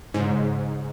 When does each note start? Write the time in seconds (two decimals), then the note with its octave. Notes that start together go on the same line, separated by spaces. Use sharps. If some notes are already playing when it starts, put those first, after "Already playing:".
0.14 G#2 C#3